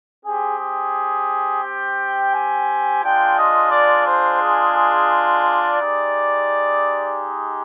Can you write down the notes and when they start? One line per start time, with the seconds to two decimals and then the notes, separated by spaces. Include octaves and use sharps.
0.23 C4 G4 G#4
0.58 G#4
1.63 G5
2.32 G#5
3.01 G#3 D4 F4 G5
3.37 D#5
3.71 D5
4.07 C5
4.41 G#4
4.75 G#4
5.46 D5
5.80 G#3 D#4 G4